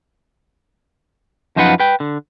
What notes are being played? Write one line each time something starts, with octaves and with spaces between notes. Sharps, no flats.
F#2 F3 D#4 F4 B4 F#5
B4 G5
D3